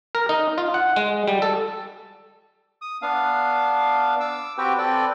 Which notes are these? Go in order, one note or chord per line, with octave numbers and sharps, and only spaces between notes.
A#4
D#4
F4
F#5
G#3
G3
A4
D#6
B3 D4 F5
D6 E6
C4 F#4 G4 B4 G5
C4 A4 B4 D5 G5